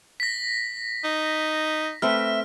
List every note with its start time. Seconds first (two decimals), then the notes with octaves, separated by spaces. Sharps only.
0.20 A#6 B6
1.04 D#4
2.02 A3 C4 B4 E5 F6